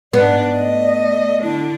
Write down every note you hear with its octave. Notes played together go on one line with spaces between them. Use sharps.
G#2 B3 D4 D5
A3 D#5
D3 D4 E4